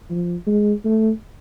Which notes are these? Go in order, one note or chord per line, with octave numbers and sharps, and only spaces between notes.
F3
G#3
A3